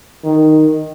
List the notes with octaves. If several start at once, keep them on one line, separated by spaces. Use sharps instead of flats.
D#3